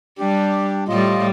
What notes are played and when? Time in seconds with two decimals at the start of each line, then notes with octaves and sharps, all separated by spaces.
0.19 G3 D4 G4
0.88 A2 G3 F4 D#5